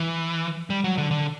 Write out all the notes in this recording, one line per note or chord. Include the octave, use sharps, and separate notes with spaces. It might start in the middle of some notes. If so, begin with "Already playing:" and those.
Already playing: E3
G3
F#3
D3
D3